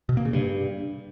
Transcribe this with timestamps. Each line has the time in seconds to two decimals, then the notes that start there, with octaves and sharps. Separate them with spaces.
0.09 B2
0.17 A#3
0.25 C#3
0.33 G2